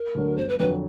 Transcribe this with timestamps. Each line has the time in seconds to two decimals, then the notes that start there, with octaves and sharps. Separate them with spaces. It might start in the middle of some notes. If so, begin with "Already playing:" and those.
Already playing: A#4
0.15 D2 D3 F#3
0.37 G1 C5
0.49 B4
0.59 F2 D3 F#3 B4